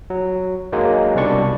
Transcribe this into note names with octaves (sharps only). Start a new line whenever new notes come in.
F#3
F#3 G#3 A#3 D#4
C2 B2 G3 D4 D5 C#6